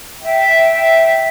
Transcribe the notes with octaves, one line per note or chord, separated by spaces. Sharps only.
E5 G5